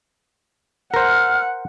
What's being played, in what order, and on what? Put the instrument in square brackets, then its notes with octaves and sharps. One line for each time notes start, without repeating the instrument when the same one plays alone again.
[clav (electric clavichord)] A#4 C5 [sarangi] F#5 [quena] F6